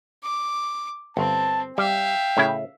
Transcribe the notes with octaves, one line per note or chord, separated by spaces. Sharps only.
D6
G1 C4 A5
G3 E5 F5 G5
A2 C#3 E4